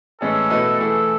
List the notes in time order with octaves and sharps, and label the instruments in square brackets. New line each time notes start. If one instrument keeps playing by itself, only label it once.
[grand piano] A2 E3 G#3 C#4 G#4 [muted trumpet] A4
[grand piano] B2 A3 E4 B4 D#5
[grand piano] E3 A3 E4 G#4 [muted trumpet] A4